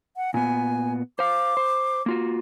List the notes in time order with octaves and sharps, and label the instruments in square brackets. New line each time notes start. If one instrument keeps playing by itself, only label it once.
[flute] F#5
[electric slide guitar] A#2 B3 [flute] G#5
[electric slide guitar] C5 F5 [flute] D6
[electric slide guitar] C5
A#3 F4 F#4